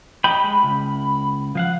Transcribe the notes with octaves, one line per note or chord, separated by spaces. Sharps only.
G4 D#5 G5 B5
G#3
C#2
F3 F5 F#5